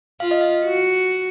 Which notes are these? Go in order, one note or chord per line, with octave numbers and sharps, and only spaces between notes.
F4 F5
D#5
F5
F#4